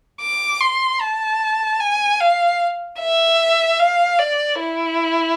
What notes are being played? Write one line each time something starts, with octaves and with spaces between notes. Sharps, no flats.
D6
C6
A5
G#5
F5
E5
F5
D5
E4